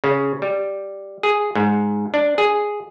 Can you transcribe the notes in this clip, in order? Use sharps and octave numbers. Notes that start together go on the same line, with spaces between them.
C#3
G3
G#4
G#2
D4
G#4